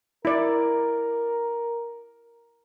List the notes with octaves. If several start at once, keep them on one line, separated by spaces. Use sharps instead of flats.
E4 A#4 D5